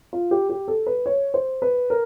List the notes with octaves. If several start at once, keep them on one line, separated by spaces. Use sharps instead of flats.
F4
G4
G4
A4
B4
C#5
C5
B4
A#4